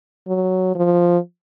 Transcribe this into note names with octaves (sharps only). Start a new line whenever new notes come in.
F#3
F3